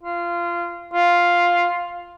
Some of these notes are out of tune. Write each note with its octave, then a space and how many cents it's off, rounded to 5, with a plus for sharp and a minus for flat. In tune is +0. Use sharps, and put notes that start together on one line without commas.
F4 -20
F4 +0